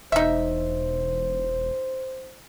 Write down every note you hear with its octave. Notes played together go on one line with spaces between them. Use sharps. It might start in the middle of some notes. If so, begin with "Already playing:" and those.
E1 D#4 C5 E5